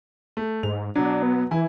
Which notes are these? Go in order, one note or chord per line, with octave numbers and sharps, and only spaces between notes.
A3
G#2 F7
B2 F#3 D4
B3
E3 E4 G#5